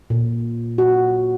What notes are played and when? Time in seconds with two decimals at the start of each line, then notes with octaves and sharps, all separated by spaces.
0.10 A#2
0.78 F#4